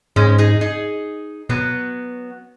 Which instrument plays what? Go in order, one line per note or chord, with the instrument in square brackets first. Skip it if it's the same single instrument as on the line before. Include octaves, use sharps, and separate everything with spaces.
[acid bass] G#2 [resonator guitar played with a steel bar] G#3 C#4
[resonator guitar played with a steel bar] D#4 G#4
D#4 G#4
[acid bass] B2 [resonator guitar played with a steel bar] F#3 B3